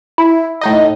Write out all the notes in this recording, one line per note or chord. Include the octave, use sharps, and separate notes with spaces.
E4
A2 D#4 D#5